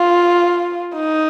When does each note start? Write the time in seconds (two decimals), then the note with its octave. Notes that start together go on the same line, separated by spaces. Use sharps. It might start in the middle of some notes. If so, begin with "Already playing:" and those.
Already playing: F4
0.95 D#4